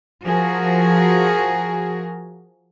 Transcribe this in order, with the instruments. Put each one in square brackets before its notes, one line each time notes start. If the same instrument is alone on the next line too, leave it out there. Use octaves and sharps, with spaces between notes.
[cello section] F3 F#4 G#4 A#4